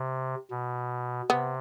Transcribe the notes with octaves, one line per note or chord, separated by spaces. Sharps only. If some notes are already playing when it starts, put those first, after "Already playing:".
Already playing: C3
B2
C3 B3